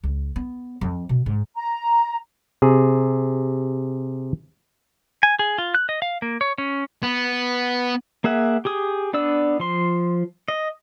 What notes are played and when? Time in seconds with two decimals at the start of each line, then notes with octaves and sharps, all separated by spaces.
0.03 C#2
0.36 B3
0.81 F2
1.09 B2
1.26 G#2
1.55 A#5
2.62 C3 G#4
5.23 G#5
5.39 G#4
5.58 F4
5.75 F#6
5.89 D#5
6.02 F5
6.22 A#3
6.41 C#5
6.58 C#4
7.03 B3
8.24 A#3 G#4 E5 F#5
8.65 G4 G#4 D#6
9.13 B3 D4 D5 E6
9.60 F3 C6
10.48 D#5